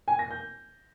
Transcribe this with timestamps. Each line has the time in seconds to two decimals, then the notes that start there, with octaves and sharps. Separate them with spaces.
0.08 G#5
0.19 A#6
0.31 G6